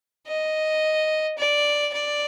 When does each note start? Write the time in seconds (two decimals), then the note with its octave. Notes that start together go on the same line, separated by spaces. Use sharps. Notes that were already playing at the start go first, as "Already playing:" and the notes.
0.27 D#5
1.37 D5
1.93 D5